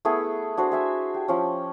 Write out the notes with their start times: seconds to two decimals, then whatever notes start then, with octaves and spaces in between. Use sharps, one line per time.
0.05 A3 B3 E4 G#4
0.57 D4 F#4 C5
0.72 G#4 E5 G#5
1.14 G4
1.28 F3 C#4